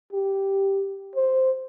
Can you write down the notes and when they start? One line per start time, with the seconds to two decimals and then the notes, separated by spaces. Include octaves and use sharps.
0.13 G4
1.16 C5